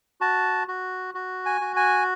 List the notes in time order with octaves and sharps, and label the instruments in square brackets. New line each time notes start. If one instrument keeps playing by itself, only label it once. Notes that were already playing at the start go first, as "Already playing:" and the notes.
[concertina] F#4 A5
F#4
F#4
G#5
F#4
G#5